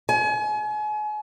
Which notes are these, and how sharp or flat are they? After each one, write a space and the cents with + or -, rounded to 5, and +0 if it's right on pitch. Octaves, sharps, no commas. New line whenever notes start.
G#5 +35